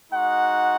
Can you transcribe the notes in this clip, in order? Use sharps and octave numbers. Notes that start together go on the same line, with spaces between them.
G#3 D#4 F#4 F#5